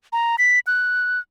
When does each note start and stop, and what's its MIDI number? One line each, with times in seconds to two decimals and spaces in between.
0.13 0.36 82
0.38 0.59 95
0.67 1.20 90